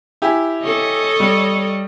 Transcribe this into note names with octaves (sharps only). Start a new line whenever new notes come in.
E4 G4 G#5
A4 C#5 D#5
G3